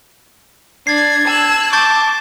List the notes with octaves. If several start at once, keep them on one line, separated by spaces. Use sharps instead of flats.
D4 G#6 A6 C7
A5 E6 F#6
A5 C#6 D6 G6 A6